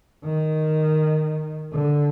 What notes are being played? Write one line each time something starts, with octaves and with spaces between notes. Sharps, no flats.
D#3
D3